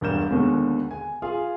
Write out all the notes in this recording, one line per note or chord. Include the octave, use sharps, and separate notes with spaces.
E1 G2 A#4 G6 E7
D#2 B2 D3 G#3
G#5
F4 G#4 F5 G#5